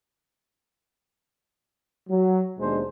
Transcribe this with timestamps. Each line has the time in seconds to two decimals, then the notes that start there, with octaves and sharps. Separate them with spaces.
2.09 F#3
2.58 D#2 B2 G#3 D4 C5